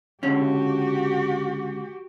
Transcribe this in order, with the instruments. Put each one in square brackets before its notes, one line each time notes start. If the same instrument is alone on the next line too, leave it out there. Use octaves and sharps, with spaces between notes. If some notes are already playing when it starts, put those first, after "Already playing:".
[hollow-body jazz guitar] C#2 D3 C#4 [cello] F#4 G4